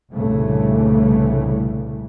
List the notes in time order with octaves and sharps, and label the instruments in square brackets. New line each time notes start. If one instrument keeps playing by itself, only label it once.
[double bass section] C2 G2 A#2 C#3 E3 A3